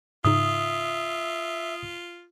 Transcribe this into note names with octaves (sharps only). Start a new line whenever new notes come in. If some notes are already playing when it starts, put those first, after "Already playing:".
G#2 C#3 D#4 F4 E5 D#6